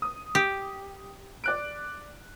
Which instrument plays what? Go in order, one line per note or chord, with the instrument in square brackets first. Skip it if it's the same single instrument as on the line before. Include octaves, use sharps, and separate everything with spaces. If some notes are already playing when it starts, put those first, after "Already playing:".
[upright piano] D#6
[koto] G4
[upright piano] D5 F#6 D7